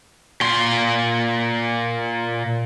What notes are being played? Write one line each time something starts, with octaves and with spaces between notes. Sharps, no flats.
A#2 C6